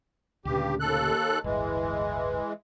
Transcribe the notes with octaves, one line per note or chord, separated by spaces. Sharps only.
D2 G2 A#2 C#3 G4
D#2 A4 F#6
D1 G1 E3 G#3